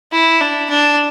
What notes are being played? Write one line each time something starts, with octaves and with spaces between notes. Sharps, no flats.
E4
D4
D4